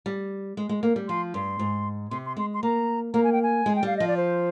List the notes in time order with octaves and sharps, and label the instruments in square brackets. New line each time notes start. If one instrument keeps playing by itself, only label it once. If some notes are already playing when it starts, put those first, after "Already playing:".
[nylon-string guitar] G3
G#3
G#3
A#3
G3
[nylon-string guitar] F3 [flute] C6
[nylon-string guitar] G2 [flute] C6
[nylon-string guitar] G#2
[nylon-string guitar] C3 [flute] C6
[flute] C6
[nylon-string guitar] G#3 [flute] C6
[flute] C6
[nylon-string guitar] A#3 [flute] A#5
[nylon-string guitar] A#3 [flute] A#5
[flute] G#5
G5
G#5
[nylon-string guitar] G#3
[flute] G5
[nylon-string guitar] G3 [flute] F5
[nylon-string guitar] F3 [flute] D#5
[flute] D5
C5